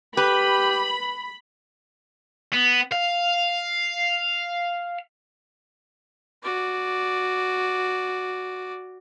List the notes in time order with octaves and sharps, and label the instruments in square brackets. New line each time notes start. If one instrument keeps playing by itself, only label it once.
[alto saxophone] G4 [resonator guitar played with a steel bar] B4 [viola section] B5
[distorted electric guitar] B3
F5
[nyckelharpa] F#4 D5